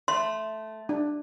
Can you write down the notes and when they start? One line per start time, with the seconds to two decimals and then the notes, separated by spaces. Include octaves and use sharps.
0.08 A3 C6
0.89 D4